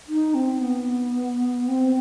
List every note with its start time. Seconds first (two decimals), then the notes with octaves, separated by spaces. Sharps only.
0.08 D#4
0.34 C4
0.61 B3
1.68 C4